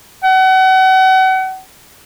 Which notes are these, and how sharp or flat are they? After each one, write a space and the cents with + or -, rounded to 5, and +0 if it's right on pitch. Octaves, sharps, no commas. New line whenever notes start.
F#5 +35